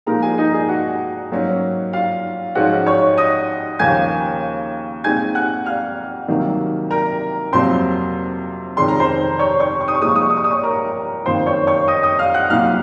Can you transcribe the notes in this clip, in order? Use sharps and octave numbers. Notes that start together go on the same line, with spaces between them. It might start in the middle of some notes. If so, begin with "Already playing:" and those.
A#2 F3 G#3 D#4 A#4 A#5
G#4 G#5
D#4 D#5
G#4 G#5
F#4 F#5
G#2 F#3 A#3 C#4
F4 F5
G#2 F3 G#3 C#4 F4 F#4 F#5
C#5 C#6
D#5 D#6
D#2 C#3 F3 A#3 G#5 G#6
A#2 G#3 C4 D#4 G#5 G#6
F#5 F#6
F5 F6
C2 C3 D#3 F#3 A#3
A#4 A#5
F2 C3 F#3 A#3 C5 C6
F1 F2 D#3 G#3 C#4 C6
A#5
C5 C6
C#5 C#6
C#5 C#6
C#6
D#6
C#6
C2 A#2 F3 G#3 D#6
C#6
D#6
C#6
D#6
C#6
D#6
C#5 C#6
A#4 A#5
F#1 F2 D#3 A#3 F4 C5 C6
C#5 C#6
C#5 C#6
D#5 D#6
D#5 D#6
F5 F6
F#5 F#6
C2 A#2 F#3 F5 F6